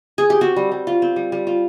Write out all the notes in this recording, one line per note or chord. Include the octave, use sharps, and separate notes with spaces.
G#4
G4
C4 F#4
G3
G3
F4
C4
G3
G3
F4